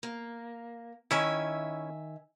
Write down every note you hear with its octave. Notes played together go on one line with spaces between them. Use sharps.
A#3
D#3 C#4 E4 E5 G#5